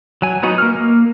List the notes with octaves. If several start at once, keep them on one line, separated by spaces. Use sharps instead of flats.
F#3 G#5
F#3 B3 D#4 F#4
A#3 F6
A#3